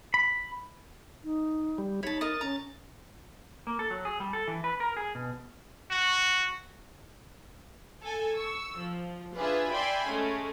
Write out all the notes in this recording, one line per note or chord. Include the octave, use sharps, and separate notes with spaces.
B5
D#4
G3
D#4 C#5 A5 B5
A#4 D#5 D#6 A6
C#4 A#5
A#3
A4
F#3
G#4
G3
A4
E3
B4
A#4
G#4
B2
F#4
A4 G#5
C#6 E6
F3
D4 F4 G#4 B4 E5
D5 E5 G5 G#5 B5 C6
G#3 A3 C#4